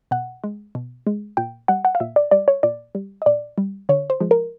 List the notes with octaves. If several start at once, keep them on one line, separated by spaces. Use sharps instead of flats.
B2 F#5
G#3
B2
G#3
A#2 G5
G3 F#5
F#5
F5
A#2 E5
D5
G3 D5
C#5
A#2 D5
G3
D#5
A#2 D5
G3
D3 C#5
C5
F3 G#3
A#4